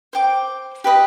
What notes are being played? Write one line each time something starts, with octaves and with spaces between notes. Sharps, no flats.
C5 G5 D6
G4 B4 D#5 B5